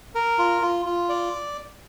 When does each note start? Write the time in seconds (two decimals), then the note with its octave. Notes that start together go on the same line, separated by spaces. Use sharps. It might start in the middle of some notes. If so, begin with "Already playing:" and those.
0.15 A#4
0.39 F4
0.62 F4
0.86 F4
1.09 D5